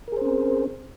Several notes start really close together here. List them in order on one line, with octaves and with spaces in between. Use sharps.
A#4 G#4 C5 C#4 C4